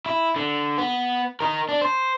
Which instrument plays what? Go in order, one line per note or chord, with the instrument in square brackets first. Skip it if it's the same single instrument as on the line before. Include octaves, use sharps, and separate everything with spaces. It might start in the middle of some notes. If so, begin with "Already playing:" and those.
[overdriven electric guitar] E4
D3
B3
D#4 A#4
D4
C5